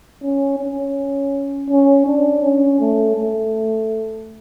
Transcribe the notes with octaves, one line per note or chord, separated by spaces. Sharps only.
C#4
C#4
C#4
D4
C#4
A3
A3